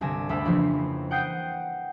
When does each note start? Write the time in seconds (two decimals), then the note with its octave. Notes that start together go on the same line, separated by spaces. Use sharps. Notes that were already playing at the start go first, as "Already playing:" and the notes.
0.01 G1 C2 D3 G#5 A#6 E7
0.29 D2 B5 E6
0.45 F2 C#3 E3 F3 A#3
1.11 F#5 G5 D#6 G6 C7 D7